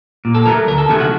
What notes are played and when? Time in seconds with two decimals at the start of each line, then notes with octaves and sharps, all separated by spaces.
0.25 A#2
0.35 A4
0.46 F#3 A3 A#4
0.67 D2 A#4
0.78 A4
0.89 C3 D#3 F#3 A3 G#4
1.00 F#4